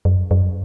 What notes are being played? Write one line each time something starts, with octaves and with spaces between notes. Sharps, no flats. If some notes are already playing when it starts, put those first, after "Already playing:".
F#2
F#2